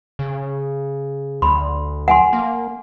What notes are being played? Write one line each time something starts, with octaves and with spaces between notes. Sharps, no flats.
C#3
D2 B5 C6
F#5 G#5 C6
A#3